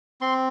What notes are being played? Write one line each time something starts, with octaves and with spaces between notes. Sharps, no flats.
C4 C6